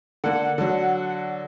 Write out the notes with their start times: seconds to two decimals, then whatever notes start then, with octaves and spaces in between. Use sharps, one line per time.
0.24 D3 A#3 F#5
0.58 D3 F#3